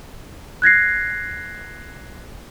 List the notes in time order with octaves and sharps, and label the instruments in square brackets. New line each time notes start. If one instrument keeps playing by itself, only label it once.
[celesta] F#6 G#6 A#6 C7